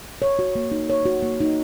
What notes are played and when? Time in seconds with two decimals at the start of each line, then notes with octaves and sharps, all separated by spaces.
0.22 C#5
0.39 F#4
0.55 A#3
0.72 D#4
0.90 C#5
1.06 F#4
1.23 A#3
1.41 D#4